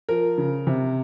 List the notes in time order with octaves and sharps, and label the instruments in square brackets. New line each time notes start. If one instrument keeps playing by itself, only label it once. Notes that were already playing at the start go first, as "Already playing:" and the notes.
[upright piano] F3 A#4
C#3
C3